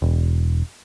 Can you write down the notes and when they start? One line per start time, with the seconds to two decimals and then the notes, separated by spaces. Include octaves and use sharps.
0.02 E1